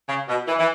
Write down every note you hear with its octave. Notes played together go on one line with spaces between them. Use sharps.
C#3
B2
E3
E3